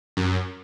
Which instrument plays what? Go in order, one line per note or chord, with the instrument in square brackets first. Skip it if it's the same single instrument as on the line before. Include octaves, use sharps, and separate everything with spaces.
[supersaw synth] F#2